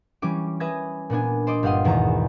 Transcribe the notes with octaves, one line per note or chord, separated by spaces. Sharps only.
E3 G3 C#4 D6
B4 E5 G#5 D#6 G#6 A#6
A#2 B3 D4 G#5
C5 D5 D#5 D6
G1 G4 F5 F#5 C6 D#6
G#1 E2 B2 D#3 A#5